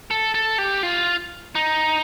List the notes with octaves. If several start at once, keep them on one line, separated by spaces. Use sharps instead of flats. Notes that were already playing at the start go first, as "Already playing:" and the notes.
A4
A4
G4
F4
D#4